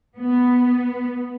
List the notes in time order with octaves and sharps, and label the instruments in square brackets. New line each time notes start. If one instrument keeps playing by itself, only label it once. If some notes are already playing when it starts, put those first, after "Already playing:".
[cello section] B3